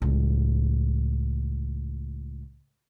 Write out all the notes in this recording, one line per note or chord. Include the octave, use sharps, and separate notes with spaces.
C#2 A2